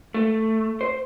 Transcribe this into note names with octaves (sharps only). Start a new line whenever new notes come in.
A3
C5